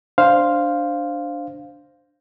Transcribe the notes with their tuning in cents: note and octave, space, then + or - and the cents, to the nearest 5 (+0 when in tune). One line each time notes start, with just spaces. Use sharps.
D4 +0 C5 +0 F5 +0